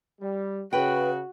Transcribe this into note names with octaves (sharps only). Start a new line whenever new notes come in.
G3
C#3 F#4 B4 G5